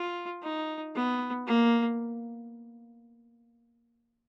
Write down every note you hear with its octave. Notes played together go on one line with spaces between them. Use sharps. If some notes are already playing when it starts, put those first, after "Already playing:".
Already playing: F4
D#4
B3
A#3